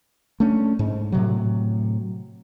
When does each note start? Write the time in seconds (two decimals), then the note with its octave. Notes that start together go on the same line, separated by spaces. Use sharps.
0.40 A3 C#4 D4
0.79 G#2
1.12 A2 C3 F#3